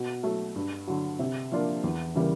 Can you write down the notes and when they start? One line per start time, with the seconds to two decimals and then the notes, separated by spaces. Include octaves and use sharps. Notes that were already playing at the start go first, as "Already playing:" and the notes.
Already playing: B2
0.23 F#3 A3
0.56 G2
0.87 D3 F#3
1.19 C3
1.52 F3 A#3 D4 F4
1.84 E2
2.15 C#3 E3 G3 A#3